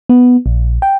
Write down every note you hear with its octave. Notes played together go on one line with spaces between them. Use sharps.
B3
A#1
G5